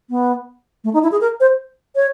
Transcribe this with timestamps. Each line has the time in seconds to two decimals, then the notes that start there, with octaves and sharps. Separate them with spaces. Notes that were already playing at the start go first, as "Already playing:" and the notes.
0.10 B3
0.84 A3
0.94 D#4
1.03 E4
1.12 G#4
1.21 A#4
1.40 C5
1.96 C#5